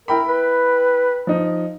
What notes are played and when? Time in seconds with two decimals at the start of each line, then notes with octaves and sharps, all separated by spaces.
0.08 E4 A#4 G5 B5
0.28 B4
1.27 F3 D#4